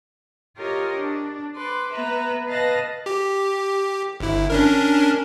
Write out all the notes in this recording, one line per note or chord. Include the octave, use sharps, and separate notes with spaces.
F4 G4 A#4 C#5 D#5
D4
B4 C6 D6
B3 B4 E5 A#5
B4 D#5 F5 A5 F#6 A#6
G4
G1 E4
C#4 D4 A#4